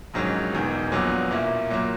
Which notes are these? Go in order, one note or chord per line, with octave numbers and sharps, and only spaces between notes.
A#1 G#2 D#3 F#3 C#4
E1 E2 D#3
A#1 A#2 F#3 B3
B1 A#2 A#3 E4
A#2 F#3 A#3